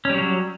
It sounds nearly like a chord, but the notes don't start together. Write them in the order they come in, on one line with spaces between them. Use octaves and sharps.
C#4 G3 F#3